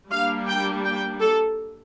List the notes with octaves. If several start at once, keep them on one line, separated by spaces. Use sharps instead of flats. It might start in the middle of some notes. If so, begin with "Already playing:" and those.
G3 A#3 D4 F5
G5
G5
A4